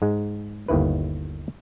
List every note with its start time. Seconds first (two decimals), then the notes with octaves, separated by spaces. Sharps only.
0.02 G#2 G#3
0.68 G1 D#2 D#3 E4 B4